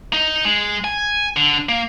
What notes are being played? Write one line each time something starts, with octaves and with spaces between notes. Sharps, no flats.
D#4
G#3
G#5
D3
A#3